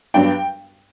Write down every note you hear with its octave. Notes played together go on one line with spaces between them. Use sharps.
G2 F#3 B3 D4 G5